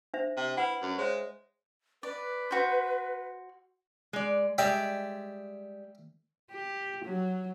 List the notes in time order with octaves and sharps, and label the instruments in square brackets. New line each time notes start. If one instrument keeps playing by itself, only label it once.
[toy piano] D4 C5 E5
[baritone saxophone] C3
[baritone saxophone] E4 [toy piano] B4 F#5
[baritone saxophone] F#2
[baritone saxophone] G#3 [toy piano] C5 C#5 E5
[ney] B4 [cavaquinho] D5
[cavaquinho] F#4 C5
[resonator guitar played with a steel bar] G#3 D5
[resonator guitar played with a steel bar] G3 G#3 [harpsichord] D5 E5 G5
[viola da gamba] G4
F#3